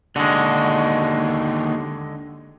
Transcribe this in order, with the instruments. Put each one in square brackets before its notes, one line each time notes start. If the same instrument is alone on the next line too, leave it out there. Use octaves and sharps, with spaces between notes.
[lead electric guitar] D#2 F#4 [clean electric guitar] D3 G#3